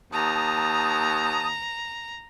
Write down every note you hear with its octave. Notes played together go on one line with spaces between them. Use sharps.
D#2 A5 A#5 D#6